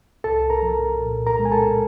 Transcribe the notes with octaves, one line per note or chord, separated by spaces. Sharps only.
C2 A4 A5
A#4 A#5
F3
A#2
A#4 A#5
G#3
G#5
A4 A5